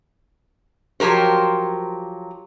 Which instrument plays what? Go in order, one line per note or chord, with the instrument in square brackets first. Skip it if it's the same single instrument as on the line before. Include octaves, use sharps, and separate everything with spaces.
[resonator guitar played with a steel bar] F3 F#3 G4 A#4 C5